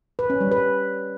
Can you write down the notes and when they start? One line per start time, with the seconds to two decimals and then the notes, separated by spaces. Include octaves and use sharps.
0.19 B4
0.30 C#4
0.41 G3
0.52 B4